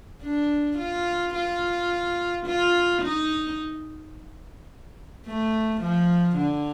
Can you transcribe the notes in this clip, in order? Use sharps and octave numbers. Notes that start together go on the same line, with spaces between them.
D4
F4
F4
F4
D#4
A3
F3
D3